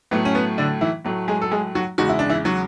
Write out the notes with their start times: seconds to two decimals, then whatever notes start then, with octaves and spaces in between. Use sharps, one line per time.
0.11 A2 F#3 A3 B3
0.25 C#4
0.35 B3
0.58 D3 D4
0.81 E3 E4
1.05 A2 F#3 A3
1.28 G#3 G#4
1.42 A4
1.52 G#3 G#4
1.75 F#3 F#4
1.98 E2 C#3 G#3 F#4
2.09 E4
2.19 D4
2.30 E3 E4
2.45 F#3 F#4